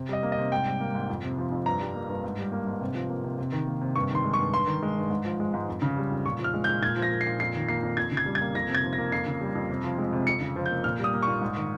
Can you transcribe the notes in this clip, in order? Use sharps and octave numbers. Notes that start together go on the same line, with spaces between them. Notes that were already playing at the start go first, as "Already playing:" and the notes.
Already playing: C3
G3 D#5
A#3
D#5
C3
G#2 G5
G3
A#3
G#2
F2
C3
F3
F2
G2 A#5
G3
A#3
G2
G#2
G3
A#3
G#2
C3
F3
A#3
C3
C3
D#3
A#3
C3
G2 C#6
D#3 C6
G#3
C#6
G2
G2 C6
D#3
G#3
G2
G#2
F3
G#3
G#2
F2
C#3
G3
F2
A#2 C#6
F3
F6
G#3
G6
A#2
A#2 G#6
F3
A#6
A#3
C7
A#2
F2 C7
D#3
A#3 C7
F2
F2 G#6
C#3
G#6
G3
G#6
A#3
F2 A#6
C3
G#6
F3
A#6
A#3
F2 C7
C#3
G3
F2
C3
F3
G#3
C3
F2 C#7
C#3
F3
G6
A#3
A#2 F6
G3 D#6
A#3
C#6
A#2
G#2
D#3